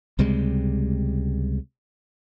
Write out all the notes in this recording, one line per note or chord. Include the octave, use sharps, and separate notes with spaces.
C#2 C3 G3 G#3